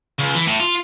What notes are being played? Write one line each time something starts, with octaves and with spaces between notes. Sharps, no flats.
C#2
E3
A2
F4